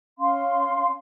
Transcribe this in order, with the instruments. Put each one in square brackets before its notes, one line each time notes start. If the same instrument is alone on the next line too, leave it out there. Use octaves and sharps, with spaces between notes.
[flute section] C#4 F5 C6